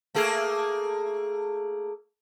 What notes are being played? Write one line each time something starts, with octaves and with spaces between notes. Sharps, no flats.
A3 A#3 G#4